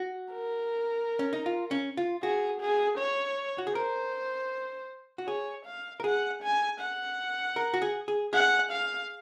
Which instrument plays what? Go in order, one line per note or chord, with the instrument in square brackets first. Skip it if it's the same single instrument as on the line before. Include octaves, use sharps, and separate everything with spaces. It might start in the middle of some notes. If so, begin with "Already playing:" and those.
Already playing: [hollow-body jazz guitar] F#4
[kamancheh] A#4
[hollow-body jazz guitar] C#4
D#4
F4
C#4
F4
[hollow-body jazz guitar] F#4 [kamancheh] G#4
[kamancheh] G#4
C#5
[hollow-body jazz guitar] F#4
G#4
[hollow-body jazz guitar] A#4 [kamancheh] C5
[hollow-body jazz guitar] F#4
[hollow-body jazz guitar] G#4 [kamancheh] C#5
[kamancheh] F5
[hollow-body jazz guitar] A#4
[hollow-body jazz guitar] G#4 [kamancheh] F#5
[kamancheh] G#5
F#5
[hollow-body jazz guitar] A#4
F#4
G#4
G#4
[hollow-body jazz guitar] G#4 [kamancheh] F#5
[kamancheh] F5